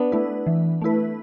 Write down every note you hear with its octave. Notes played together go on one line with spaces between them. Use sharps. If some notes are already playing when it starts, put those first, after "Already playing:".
Already playing: B3 D4
A3 E4 B4
E3
A3 E4 B4